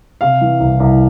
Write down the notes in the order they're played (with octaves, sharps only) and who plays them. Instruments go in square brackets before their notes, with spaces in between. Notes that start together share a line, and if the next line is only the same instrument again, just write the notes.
[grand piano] C3 F5
E3
C2
C2